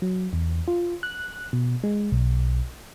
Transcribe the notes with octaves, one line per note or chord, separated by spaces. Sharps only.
F#3
E2
F4
F#6
B2
G#3
B1